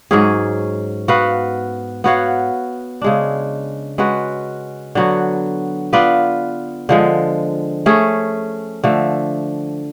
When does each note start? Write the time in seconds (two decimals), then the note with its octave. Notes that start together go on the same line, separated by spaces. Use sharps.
0.11 G#2 F#3 C#4 G#4
1.08 B3 F#4 B4 F5
2.04 B3 F#4 C#5 F5
3.02 C#3 G#3 D4
3.98 G#3 C#4 F#4 B4
4.95 D3 F#3 B3 F#4
5.93 B3 F4 B4 D5
6.89 D3 F3 G#3
7.86 A3 C#4 G#4
8.84 D3 F3 A3